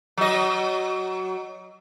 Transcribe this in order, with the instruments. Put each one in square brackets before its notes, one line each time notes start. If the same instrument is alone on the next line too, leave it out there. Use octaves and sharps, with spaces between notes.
[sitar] F#3 D#5